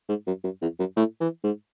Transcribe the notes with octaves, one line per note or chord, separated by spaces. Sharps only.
G#2
F#2
F#2
E2
F#2
A2
E3
G#2